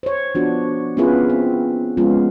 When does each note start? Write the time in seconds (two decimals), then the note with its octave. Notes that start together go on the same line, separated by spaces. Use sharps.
0.03 C5 C#5
0.35 F3 B3 D4 F#4
0.97 B3 C#4 E4 F4 G#4 B4
1.29 C4
1.97 F3 G#3 B3 C#4 F4